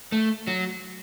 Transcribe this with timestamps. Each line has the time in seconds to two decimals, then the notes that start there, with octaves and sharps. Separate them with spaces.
0.12 A3
0.47 F#3